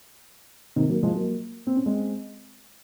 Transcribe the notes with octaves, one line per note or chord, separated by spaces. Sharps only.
C3 D#3
F#3 A#3
F3 G#3
F#3 A#3
C4
C#4
G#3 C4